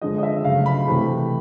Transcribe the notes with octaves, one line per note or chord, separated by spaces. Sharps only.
D3 F3 G#3 D#5
D#5
E5
C#3 F#3 A3 F5
B5
C3 E3 A3